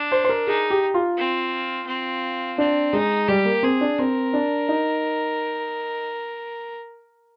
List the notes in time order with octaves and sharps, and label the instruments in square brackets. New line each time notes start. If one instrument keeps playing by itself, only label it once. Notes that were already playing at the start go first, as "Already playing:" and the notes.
Already playing: [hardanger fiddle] D4
[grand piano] C5
C5
A#4
[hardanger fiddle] D#4 [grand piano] G#4
[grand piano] G4
F4
[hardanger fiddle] C4
C4
[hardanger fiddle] C4 [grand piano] D4
[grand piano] G#3 [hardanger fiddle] D#4
[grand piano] G3 [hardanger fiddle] G4
[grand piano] A#3
[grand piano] C4 [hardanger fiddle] G#4
[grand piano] D4
[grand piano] C4 [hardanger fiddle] A#4
[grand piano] D4
D#4